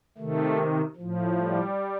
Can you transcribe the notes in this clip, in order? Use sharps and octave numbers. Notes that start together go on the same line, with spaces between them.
C3 D#3 A3
A2 F3
G3